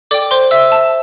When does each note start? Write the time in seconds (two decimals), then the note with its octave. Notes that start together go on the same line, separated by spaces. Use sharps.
0.11 A4 D5 G5 D6
0.31 C5 C6
0.51 E5 E6
0.72 A5